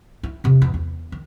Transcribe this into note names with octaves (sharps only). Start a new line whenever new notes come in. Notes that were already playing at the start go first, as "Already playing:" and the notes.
E4
E2 C3
E2
E2
D#3